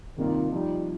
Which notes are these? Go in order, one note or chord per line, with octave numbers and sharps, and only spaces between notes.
C3 D#3 G3 A#3 F4
F3 G3 D#4